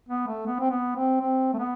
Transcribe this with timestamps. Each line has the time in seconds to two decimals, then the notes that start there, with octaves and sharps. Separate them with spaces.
0.09 B3
0.27 A3
0.47 B3
0.60 C4
0.71 B3
0.96 C4
1.21 C4
1.53 A3
1.59 B3